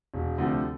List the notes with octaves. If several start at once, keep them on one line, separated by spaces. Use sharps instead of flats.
E1
D2 C3 F3